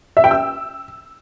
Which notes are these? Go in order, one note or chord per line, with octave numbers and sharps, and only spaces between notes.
E5
G5
E6